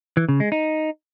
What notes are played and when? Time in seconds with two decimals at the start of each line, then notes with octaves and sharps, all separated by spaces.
0.17 E3
0.29 C#3
0.40 G#3
0.52 D#4